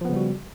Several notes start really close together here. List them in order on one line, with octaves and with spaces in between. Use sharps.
F3 B3 C#3 G3 F#4